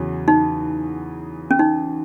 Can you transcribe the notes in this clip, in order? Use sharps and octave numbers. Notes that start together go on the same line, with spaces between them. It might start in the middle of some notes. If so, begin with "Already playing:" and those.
Already playing: E2 C#3 F#3
D#4
C#4
D#4